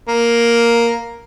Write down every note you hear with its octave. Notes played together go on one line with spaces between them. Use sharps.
A#3